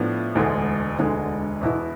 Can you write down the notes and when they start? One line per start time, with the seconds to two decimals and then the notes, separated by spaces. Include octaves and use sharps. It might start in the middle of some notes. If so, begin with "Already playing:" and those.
Already playing: A2 F3 B3 D4
0.35 E1 D2 D3 G#3
0.98 E1 D2 D3 G#3
1.61 E2 B2 B3 E4